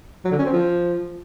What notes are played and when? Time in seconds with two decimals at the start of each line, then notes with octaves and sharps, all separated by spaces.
0.25 F#3
0.32 D3
0.39 C#4
0.46 C4
0.53 F3